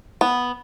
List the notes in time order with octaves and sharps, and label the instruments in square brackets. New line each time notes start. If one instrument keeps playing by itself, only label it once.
[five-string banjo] B3